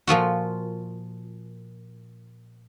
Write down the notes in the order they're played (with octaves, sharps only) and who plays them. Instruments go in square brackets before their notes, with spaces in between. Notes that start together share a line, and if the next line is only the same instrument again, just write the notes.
[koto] A#2 F3 F4 F#4